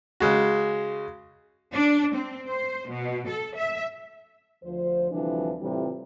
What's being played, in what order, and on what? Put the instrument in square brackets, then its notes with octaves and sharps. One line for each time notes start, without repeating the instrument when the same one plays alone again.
[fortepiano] C#3 G#3 F#4
[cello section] D4
C4
C5
B2
A4
E5
[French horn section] D2 F3 C5
D2 C3 E3 F3 G3 D4
A2 C3 E3 G3 F4